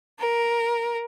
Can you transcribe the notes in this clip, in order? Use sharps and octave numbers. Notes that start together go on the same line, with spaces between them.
A#4